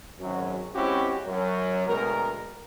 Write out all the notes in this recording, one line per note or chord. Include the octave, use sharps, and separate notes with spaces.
G#1 F#2 F#3
G#3 C4 C#4 E4 F#4 G4
F#2 F#3
D2 B2 G#3 A#4